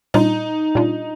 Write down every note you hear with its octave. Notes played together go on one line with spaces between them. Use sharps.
A#2 G3 D4 D#4 F4
A#2 G3 D4 F4